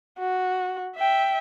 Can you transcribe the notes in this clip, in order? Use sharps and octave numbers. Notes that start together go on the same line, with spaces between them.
F#4
E5 G5